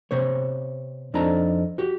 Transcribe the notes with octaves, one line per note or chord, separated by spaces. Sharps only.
C3 B3 C5 C#5
F2 C4 D4 D#4 A4 A#5
F#4 G4